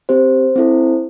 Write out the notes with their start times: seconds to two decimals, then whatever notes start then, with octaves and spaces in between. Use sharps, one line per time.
0.09 C4 G4 C5
0.56 C4 E4 A4